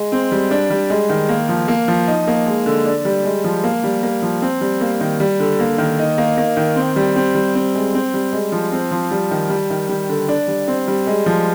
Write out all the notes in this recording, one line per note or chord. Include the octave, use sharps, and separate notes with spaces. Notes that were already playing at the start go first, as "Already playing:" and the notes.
Already playing: G#3
C4
G3
D4
G3
G#3
D#3
A#3
F3
A#3
F3
D#4
A#3
G#3
D3
D4
G3
G#3
F3
A#3
G3
A#3
F3
C4
G3
A#3
D#3
G3
D3
A#3
D#3
D#4
A#3
A#3
D#3
C4
G3
C4
G3
C4
G#3
C4
G3
G#3
F3
C4
F3
G3
D#3
G3
D#3
G3
D3
D4
G3
C4
G3
G#3
F3